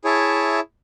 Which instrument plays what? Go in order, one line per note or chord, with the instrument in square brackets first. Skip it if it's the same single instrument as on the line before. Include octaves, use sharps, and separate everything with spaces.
[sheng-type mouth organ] E4 G#4 C#5 E5 A5